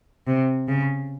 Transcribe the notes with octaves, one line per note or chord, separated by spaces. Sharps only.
C3
C#3